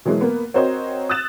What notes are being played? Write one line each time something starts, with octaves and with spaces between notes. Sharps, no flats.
B2 E3 F#3 G#3 A#3
A#3 B3
C4 F#4 A#4 C5 C#5 D#5
D#6 E6 F#6 A6 E7